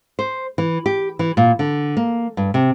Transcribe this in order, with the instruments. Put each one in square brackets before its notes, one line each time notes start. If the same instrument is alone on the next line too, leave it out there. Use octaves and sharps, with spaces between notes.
[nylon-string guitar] C5
E3
G4
E3
A#2
D3
A#3
G2
C3